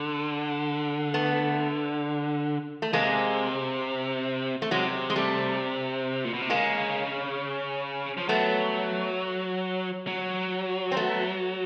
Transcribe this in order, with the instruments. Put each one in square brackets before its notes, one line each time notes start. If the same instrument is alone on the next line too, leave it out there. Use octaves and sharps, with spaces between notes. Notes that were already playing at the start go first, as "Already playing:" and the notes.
Already playing: [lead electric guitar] D3
[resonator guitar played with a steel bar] A3 B3
A3
[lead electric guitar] C3 [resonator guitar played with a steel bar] G#3 A#3
[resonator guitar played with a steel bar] A3
[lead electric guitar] C3 [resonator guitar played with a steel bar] F#3 G#3
[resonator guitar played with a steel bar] G#3
G3 A3
[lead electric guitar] A#2
B2
C3
[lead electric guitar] C#3 [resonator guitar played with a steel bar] G#3 A#3
[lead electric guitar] F3
[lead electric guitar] F#3 [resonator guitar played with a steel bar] A3 B3
[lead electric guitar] F#3
[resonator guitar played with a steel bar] C4
A3 B3